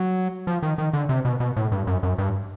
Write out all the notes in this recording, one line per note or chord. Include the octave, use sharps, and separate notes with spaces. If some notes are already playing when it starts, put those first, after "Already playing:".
Already playing: F#3
F3
D#3
D#3
D3
C3
B2
B2
A2
G2
F#2
F#2
G2